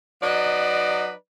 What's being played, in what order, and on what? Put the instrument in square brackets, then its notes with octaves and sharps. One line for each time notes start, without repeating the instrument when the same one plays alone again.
[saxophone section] F#3 D#4 B4 D5 D#5